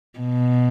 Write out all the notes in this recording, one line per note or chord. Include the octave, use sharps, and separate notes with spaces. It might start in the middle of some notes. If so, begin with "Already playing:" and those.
B2